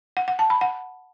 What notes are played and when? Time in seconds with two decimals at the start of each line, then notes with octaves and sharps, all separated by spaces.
0.17 F#5
0.28 F#5
0.39 A5
0.50 B5
0.61 F#5